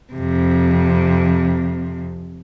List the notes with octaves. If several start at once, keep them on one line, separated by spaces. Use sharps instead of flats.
F2 C3